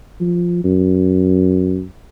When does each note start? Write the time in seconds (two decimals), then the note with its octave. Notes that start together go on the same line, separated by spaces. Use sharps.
0.20 F3
0.64 F#2